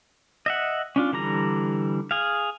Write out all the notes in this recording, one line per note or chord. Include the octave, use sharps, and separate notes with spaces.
D#5 E5 F#5
C#4 D4 F4
D3 E3 G3 A#5
G#4 F5